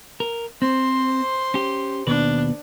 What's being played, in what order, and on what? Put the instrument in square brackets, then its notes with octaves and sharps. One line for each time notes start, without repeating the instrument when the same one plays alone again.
[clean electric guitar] A#4
[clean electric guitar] C4 [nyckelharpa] C5 C6
[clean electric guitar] C#4 G4
[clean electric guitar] D#2 B2 B4 [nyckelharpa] D4